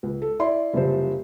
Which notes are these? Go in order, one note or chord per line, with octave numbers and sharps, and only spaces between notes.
C#2
A4
E4 D5 C6
F#1 G2 C3 F3 C5